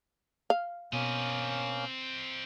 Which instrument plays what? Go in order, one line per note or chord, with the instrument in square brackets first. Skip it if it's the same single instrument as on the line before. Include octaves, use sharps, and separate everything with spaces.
[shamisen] F5
[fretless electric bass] B2 [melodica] A#3 C#4 [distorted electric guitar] C4 D#5